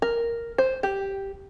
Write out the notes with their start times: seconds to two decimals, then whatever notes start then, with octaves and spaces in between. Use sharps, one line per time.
0.02 A#4
0.58 C5
0.83 G4